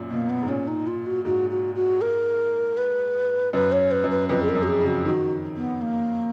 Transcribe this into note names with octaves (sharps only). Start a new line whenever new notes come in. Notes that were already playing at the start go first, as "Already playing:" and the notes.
Already playing: F#2 A#2
B2 A#3
B3
G#2
A#2 C#4
D#4
F4
F#4
G#2 F#4
F#4
F#4
A#4
B4
F#2 B4
C#5
B4
F#2
B4
F2 B4
G#4
A#4
F#2
F#4
G#4
C#3
F#4
D#3 F#4
B3
A#3